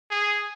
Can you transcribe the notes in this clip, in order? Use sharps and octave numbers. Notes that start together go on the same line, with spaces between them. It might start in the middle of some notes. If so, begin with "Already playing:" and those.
G#4